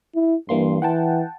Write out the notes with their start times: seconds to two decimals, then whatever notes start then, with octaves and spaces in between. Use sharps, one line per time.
0.15 E4
0.49 G2 E3 A#3 C6
0.82 E3 F#5 G5 A5